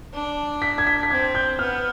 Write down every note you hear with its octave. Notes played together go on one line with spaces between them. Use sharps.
D4
B6
G#6
B6
B6
C4 G#6
G6
B3 F6